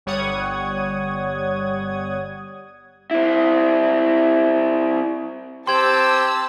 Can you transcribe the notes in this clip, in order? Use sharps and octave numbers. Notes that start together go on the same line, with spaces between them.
G1 G3 C#5 F#5 D#6 G#6
C4 E4
C4 G4 A5 C6 E6 G#6 F#7